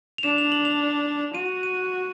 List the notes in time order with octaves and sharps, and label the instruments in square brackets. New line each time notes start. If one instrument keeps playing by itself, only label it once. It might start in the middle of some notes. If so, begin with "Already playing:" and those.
[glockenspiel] F7
[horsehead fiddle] D4 [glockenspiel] E7
[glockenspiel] F7
F#7
F7
[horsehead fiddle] F#4 [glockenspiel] D#7
[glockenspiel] D#7